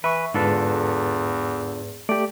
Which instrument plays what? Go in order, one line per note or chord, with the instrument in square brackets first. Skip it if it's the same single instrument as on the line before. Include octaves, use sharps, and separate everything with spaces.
[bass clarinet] E3 [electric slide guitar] B4 [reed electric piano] E5 C#6
[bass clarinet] E2 [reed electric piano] G#2 B4 [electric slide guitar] D3 F4 A4
[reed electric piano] A3 G4 [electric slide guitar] D5